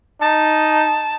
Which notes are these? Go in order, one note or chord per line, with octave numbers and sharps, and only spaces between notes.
D#4 A5